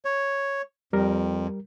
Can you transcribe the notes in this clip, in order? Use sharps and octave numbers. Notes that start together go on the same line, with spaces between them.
C#5
F2 G3 A#4